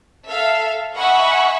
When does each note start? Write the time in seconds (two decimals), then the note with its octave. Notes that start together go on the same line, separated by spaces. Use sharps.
0.24 A4 E5 F5
0.97 D#5 E5 F#5 G#5 B5 C#6